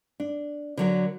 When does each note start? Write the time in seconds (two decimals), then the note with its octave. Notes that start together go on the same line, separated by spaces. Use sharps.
0.20 D4
0.77 D3 F#3 A#4